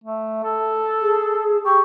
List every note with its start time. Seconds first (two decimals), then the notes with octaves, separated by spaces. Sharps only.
0.04 A3
0.44 A4
1.01 G#4
1.64 G4 C#6